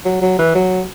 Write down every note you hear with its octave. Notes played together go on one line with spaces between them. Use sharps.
F#3
F#3
E3
F#3